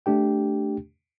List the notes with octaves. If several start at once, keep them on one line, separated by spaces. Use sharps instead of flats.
A3 D4 G4 G5